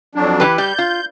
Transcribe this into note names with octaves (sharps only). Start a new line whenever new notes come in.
F2 F#3 D4
E3 G4 B4
G3 G6
F4